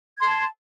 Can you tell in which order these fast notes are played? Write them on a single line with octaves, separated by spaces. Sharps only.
G#6 C6 A5